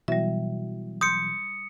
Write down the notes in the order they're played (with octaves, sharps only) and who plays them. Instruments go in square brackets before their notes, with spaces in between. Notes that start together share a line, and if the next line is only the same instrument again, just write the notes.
[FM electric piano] B2 E3 F#3 [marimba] G3 E5
[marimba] C6 G6 [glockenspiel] D#6 C#7